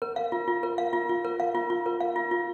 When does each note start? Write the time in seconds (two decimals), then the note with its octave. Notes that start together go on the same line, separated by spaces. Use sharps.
0.02 A#4
0.16 F5
0.32 F4
0.48 F4
0.63 A#4
0.78 F5
0.93 F4
1.09 F4
1.25 A#4
1.40 F5
1.55 F4
1.70 F4
1.86 A#4
2.00 F5
2.16 F4
2.31 F4